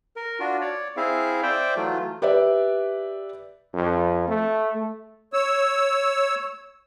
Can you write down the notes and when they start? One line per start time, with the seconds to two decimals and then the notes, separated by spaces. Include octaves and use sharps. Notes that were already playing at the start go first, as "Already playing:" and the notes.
0.16 A#4
0.40 D4 F4 F#4
0.61 C#5 D5
0.97 C4 E4 G#4 E5 F5
1.43 C5 D5 E5 G5
1.76 E3 F#3 A3 F4
2.22 G4 B4 D5 E5
3.74 F2
4.28 A3
5.33 C#5 E6